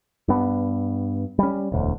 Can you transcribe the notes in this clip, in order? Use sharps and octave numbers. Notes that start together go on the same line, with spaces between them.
G2 B3
G3 C#4
E1 D2